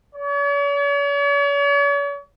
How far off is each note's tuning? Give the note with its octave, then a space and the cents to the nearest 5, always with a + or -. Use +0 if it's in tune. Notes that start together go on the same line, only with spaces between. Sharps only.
C#5 +45